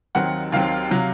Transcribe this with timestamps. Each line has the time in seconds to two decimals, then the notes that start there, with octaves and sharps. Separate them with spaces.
0.15 D#2 D#3 F#3 C4 F#5
0.52 D#2 D#3 F#3 C4 F5
0.91 C3 F#3